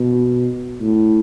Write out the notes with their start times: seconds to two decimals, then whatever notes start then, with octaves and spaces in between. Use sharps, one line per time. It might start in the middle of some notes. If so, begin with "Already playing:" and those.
Already playing: B2
0.81 A2